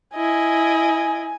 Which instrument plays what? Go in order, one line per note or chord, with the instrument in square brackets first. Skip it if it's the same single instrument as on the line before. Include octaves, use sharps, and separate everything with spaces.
[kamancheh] E4 D#5 [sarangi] G#5